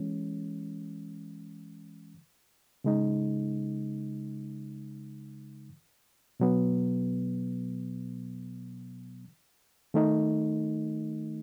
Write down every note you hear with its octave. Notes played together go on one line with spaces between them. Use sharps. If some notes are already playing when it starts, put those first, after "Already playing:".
Already playing: E3 G#3 C#4
C#3 G#3 D#4
B2 F#3 B3
D#3 A3 D#4